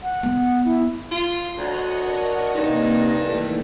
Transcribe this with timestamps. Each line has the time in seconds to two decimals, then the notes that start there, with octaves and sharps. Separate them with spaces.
0.02 F#5
0.23 B3
0.65 E4
1.11 F4 C6
1.58 D2 C#5 D#5 F#5
2.03 D4 F#4 A#4
2.55 G2 C3 A#3 D#4
3.11 D#3 E3 A3